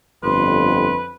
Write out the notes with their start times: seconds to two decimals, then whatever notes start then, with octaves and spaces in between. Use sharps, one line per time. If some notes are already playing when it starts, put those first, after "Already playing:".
0.23 G1 F2 B4 C6